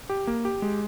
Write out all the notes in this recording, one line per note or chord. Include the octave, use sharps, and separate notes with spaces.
G4
A#3
G4
G#3